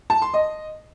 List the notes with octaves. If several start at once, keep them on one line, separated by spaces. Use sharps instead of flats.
A5
C6
D#5